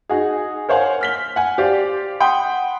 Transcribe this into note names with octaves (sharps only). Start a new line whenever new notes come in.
D#4 F#4 G#4
A#4 C5 C#5 F5 F#5 G#5
F6 B6 G7
F#5 G#5
G4 C5 D5 F5
F#5 G5 B5 C6 D#6